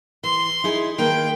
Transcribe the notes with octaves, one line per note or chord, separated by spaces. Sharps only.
E3 C6
D#4 E4 G#4
D#3 A#3 B4 G5